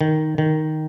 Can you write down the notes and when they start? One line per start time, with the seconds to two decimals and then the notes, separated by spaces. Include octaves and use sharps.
0.01 D#3
0.38 D#3